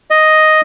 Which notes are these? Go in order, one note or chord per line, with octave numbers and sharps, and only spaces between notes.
D#5